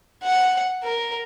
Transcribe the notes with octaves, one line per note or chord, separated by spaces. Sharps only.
F#5
A#4